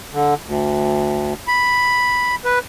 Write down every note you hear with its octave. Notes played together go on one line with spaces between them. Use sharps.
D3
D2
B5
B4